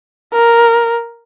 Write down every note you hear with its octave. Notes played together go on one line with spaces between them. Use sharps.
A#4